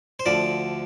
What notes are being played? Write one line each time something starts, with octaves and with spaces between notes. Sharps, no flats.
C5
D2 D3 F3 D5